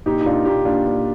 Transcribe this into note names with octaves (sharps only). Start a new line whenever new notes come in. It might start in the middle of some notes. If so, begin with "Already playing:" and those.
A#2 D#4 G4
D#4
A#2 D4 F4
A#2 D#4 G4
A#2 D4 F4
A#2